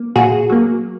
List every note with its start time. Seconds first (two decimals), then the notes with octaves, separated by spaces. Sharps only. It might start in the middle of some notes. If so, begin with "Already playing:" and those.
Already playing: A#3
0.16 A#2 F#4 G#4
0.49 F#3 A#3